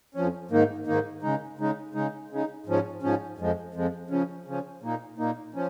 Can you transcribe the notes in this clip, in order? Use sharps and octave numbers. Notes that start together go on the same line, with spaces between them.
F2 F3 C#4
G#2 D#3 A#3 D#4
G#2 D#3 A#3 D#4
C#3 G#3 D#4
C#3 G#3 D#4
C#3 G#3 D#4
C#3 G#3 D#4
G#2 F3 C#4
G#2 F3 C#4
F2 F3 G#3
F2 F3 G#3
C#3 F3 C#4
C#3 F3 C#4
A#2 A#3 D#4
A#2 A#3 D#4
F3 C#4